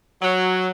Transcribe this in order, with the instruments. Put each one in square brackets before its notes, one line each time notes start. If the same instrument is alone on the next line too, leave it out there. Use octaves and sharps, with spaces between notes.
[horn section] F#3